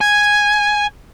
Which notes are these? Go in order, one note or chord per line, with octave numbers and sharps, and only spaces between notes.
G#5 G#6